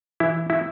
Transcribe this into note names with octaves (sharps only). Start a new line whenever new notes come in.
E3 E4
E4